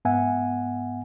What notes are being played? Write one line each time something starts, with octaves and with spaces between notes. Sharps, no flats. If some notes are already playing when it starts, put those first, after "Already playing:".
G#2 B3 E5 F#5 G#5